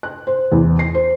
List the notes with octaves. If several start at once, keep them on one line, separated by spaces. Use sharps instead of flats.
F#6
C5
E2
C7
C5